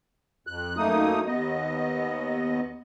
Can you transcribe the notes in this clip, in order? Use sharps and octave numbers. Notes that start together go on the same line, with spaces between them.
F2 F#6
F#2 A3 A#3 D#4 D#6
D#2 B3 D#5